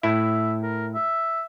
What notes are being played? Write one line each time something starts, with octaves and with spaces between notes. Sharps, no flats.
A2 E4 E5
A#4
E5